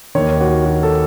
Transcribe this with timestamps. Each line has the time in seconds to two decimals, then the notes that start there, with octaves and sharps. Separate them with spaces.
0.15 D#2 D#3 C#5
0.41 F#4
0.66 F#4
0.83 A4